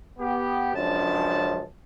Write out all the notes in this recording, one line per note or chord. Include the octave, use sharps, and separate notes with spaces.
B3 G4
C#2 F#2 F3 D4 A5